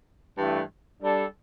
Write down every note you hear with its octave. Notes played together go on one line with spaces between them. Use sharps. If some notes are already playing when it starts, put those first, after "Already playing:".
G2 E3 A3
G3 D4 A4